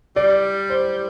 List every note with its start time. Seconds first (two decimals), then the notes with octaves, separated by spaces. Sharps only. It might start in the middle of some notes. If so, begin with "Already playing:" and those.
0.16 G3 D5
0.70 C5